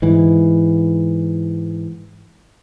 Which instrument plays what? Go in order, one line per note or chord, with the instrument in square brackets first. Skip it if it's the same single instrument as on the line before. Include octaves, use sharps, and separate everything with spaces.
[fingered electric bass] G#2 E3